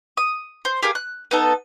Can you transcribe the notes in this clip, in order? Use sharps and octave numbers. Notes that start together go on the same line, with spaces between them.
D#6
C5
G4 G#4 A#4 F5
F#6
B3 D#4 A4